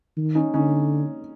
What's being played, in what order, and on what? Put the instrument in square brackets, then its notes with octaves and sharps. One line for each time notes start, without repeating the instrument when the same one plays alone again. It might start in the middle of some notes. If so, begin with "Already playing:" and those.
[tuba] D#3
[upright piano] C#4 D#4
[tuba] D3 [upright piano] C#4 D#4